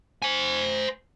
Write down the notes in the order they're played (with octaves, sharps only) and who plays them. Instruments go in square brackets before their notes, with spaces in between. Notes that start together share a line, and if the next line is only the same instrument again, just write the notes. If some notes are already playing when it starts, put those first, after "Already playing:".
[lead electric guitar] C5 G#5